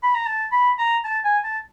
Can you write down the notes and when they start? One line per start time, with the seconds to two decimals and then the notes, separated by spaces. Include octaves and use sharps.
0.03 B5
0.15 A#5
0.26 A5
0.52 B5
0.79 A#5
1.05 A5
1.24 G#5
1.44 A5